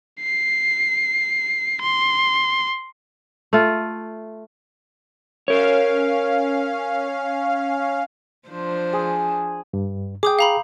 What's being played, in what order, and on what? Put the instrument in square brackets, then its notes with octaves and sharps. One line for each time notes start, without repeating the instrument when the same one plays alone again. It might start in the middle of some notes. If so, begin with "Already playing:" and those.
[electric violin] C7
C6
[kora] A3 F4
[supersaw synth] C#4 F5 [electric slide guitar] A#4 C#5
[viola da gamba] F3 D4 C5
[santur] G#4
[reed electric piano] G2
[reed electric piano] G#4 G5 [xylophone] D6 D#6 G6
[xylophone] F5 A#5 B5